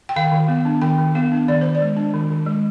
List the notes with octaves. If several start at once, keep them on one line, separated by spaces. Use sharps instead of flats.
G5
D#3 F5
D#3
B3
D4
D#3 G5
D#3
B3 F5
D4
D#3 D5
D#3 C5
D5
G#3
D4
D#3
D#3
G#3